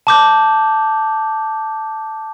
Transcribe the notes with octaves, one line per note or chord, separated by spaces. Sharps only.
A5 D6 G6